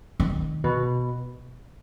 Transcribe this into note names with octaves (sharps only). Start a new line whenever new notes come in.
D#3
B2